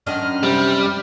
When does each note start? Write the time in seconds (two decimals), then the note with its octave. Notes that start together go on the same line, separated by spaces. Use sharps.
0.07 F#2 D#3 D4 F6
0.43 C3 G3